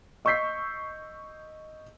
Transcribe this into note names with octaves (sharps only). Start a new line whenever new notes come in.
D#5 C#6 E6 G6 B6 C7